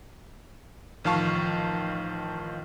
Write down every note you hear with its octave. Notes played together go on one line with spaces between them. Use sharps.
A1 D#3 F3 F5 A5 C#6